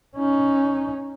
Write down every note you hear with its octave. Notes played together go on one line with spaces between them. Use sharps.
C#4 D#4